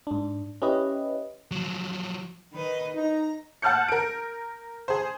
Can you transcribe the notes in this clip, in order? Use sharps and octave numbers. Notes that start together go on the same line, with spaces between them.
G#2 D4
C#4 E4 G4 B4 D#5
F3 F#3
D#3 B4 D#5
D#4 A#5
F#5 A5 F6 G6 C#7
A#4 D7
G#4 C5